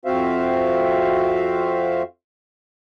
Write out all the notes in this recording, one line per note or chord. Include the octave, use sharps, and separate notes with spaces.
F2 C4 F#4 C5 E5 F5